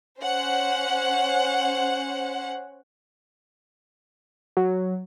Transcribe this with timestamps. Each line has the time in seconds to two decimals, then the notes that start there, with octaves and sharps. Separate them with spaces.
0.19 C#4 C5 F#5
4.57 F#3